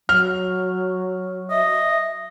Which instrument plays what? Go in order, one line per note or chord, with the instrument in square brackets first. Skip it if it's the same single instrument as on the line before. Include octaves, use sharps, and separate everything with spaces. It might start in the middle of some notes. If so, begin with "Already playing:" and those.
[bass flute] F#3 [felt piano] F6
[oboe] D#5 [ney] E5